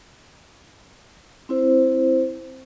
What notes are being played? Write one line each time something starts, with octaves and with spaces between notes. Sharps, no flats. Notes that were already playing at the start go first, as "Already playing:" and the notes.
C4 E4 C5